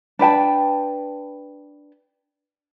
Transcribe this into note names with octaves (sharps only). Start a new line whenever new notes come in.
D4 B4 G5 A5